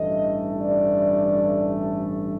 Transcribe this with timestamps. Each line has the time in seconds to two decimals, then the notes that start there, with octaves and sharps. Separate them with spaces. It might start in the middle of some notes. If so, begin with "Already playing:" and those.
Already playing: A1 G2 E3 A3 D#5
0.61 D5